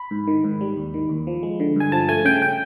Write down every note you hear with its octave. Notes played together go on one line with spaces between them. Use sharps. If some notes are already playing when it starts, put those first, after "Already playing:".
Already playing: B5
G#2
D#3
G#2
G3
D#2
D#3
D#2
F3
G#3
D3
G2 G#5
F3 A5
A3 G#5
C#3 G5
G5